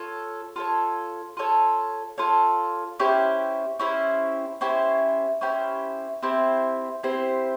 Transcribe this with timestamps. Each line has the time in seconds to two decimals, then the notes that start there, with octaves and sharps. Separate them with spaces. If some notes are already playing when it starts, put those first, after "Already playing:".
Already playing: F4 A4 C#5
0.56 F4 A4 C#5
1.37 F4 A4 C#5
2.18 F4 A4 C#5
2.99 C#4 E4 G4 C5
3.79 C#4 E4 G4 C5
4.61 C#4 E4 G4 C5
5.41 C#4 E4 G4 C5
6.23 C4 E4 G4 C5
7.03 C4 E4 G4 C5